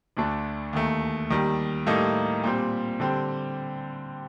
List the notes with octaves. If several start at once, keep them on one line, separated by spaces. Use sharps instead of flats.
D2 D3 A3 D4
D#2 D#3 A3
D#2 D#3 G3
A2 G3 A#3 D#4 A4
A#2 G3 C4
D3 G3 C4